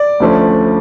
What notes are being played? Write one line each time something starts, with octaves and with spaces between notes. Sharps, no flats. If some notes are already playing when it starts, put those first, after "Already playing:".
Already playing: D5
D2 D3 F3 A3 C#4